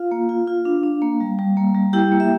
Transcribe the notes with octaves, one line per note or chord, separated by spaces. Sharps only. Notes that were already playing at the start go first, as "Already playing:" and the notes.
Already playing: F4 F5
A#3
F4
F4
D4
D4
A#3
G3
G3
A#3
G3
E4 G4 G5
A#3
E5